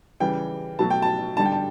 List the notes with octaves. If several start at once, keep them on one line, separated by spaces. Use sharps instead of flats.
C#3 E3 G3 G5
B2 F#3 A3 A5
G5
A5
D3 G3 A5
G5
A5